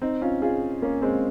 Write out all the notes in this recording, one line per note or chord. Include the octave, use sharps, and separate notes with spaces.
C4 D#4
C#4 F4
F4 G#4
A#3 C#4
G#3 C4